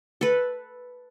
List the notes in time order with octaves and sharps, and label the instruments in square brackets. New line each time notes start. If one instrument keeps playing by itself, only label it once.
[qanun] A4 B4